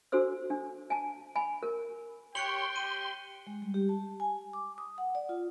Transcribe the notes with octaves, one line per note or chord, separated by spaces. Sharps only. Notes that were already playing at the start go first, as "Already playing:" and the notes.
D4 F#4 A4 C5 E6
D4
G#5 A5
G#5 B5
A#4
G4 C#5 G5 C6 F#6 C#7 F#7
G4 D#7
G#3
G3
G4
A5
G#5
D6
D#6
F#5
D5
F4